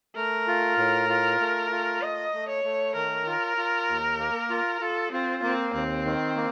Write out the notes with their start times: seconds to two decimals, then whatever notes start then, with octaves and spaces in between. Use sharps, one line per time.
0.16 A3 A#4
0.47 F4
0.78 A2
1.09 F4
1.40 A3
1.71 F4
2.02 A3 D#5
2.34 A3
2.49 C#5
2.64 A3
2.95 D#3 A#4
3.26 F4
3.57 F4
3.89 D#2
4.19 A#3
4.50 F4
4.81 F4 A4
5.12 C4 F4
5.42 A#3 C4
5.73 D#2 C4
6.05 D#3
6.36 A#3